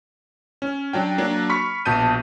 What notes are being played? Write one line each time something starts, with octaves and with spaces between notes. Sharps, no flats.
C#4
F#3 D4 G5
F#3 A#3 D4
B5 C#6 F6 B6
A#1 B2 A5 G6 D#7